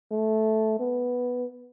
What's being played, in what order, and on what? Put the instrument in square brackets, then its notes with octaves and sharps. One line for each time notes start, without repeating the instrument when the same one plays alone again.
[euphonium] A3
B3